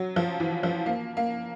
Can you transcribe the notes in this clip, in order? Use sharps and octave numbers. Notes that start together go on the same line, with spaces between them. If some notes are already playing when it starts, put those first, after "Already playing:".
Already playing: F#3
F3
E3
F3
A#3
A#3